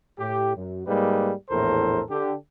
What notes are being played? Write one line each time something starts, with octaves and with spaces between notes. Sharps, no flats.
A2 G4
F#2
G#2 G3 G#3 A#3 D#4 B4
A#1 E2 A2 A4 A#4 C5
D3 D4 G4